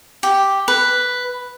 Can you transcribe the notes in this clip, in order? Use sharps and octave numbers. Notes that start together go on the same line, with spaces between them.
G4
B4